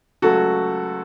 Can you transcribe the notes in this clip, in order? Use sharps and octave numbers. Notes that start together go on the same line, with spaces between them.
C#2 C#3 F#3 A3 F#4 A4